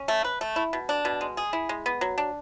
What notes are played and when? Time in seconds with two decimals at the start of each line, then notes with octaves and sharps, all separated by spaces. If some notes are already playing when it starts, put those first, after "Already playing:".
Already playing: C#4
0.08 A3
0.24 B4
0.41 A3
0.56 E4
0.73 B2
0.89 D4
1.05 B2
1.21 G#3
1.37 G#4
1.53 E4
1.69 G#3
1.86 B3
2.01 F#3
2.18 D4